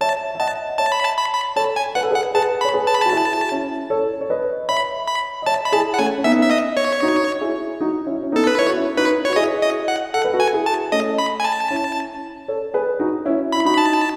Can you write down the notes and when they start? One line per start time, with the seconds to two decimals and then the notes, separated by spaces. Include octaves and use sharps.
0.01 C#5 E5 A5
0.35 E5
0.40 D#5 F#5 A5
0.78 C#5 E5 A5
0.92 B5
1.05 A5
1.17 B5
1.33 B5
1.56 A4 C#5 A5
1.76 G#5
1.95 B4 F#5
2.03 A4
2.11 G#4 B4
2.15 F#5
2.35 G#4 B4 A5
2.61 B5
2.65 C#5
2.73 G#4 B4
2.87 A5
2.94 B5
3.01 F#4 A5
3.12 E4 G#4
3.51 C#4 E4
3.90 A4 C#5
4.21 C#5
4.30 B4 D#5
4.69 C#5 E5 B5
5.08 B5
5.42 D#5
5.46 C#5 E5 A5
5.65 B5
5.72 E4 G#4 A5
5.94 F#5
5.98 A3 C#4 G#5
6.18 C#4
6.24 B3 D#4 E5
6.42 E5
6.51 D#5
6.77 C#5
7.02 D#4 F#4
7.41 E4 G#4
7.80 D#4 F#4
8.06 C#4 E4
8.23 C#4
8.32 B3 D#4
8.36 A4
8.47 B4
8.58 E4 C#5
8.68 F#4
8.77 C#4 E4
8.97 D#4 F#4 B4
9.25 F#4 C#5
9.36 E4 G#4 D#5
9.62 D#5
9.88 F#5
10.14 A4 F#5
10.24 B4
10.33 F#4 A4
10.40 G#5
10.53 E4 G#4
10.66 A5
10.92 A3 C#4 D#5
11.18 B5
11.40 G#5
11.44 A5
11.70 C#4 E4
12.48 A4 C#5
12.74 G#4 B4
13.00 D#4 F#4
13.26 C#4 E4
13.52 E4 B5
13.65 D#4 F#4 B5
13.78 A5